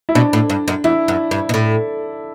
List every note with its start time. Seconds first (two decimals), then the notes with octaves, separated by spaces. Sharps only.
0.09 E4
0.15 B2 D4
0.33 A2
0.50 G2
0.68 F#2
0.84 E2 E4
1.08 F#2
1.31 G2
1.49 B2
1.54 A2